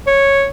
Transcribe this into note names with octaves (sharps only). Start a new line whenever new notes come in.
C#5